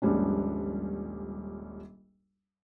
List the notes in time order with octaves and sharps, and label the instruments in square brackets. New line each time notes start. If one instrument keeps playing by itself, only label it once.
[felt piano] D#1 A#1 G#2 G3 C#4 D4